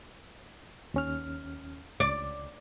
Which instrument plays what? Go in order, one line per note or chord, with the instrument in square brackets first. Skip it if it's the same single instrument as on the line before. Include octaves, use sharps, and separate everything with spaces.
[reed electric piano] D#2 C#4 F6
[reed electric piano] C#2 [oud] D5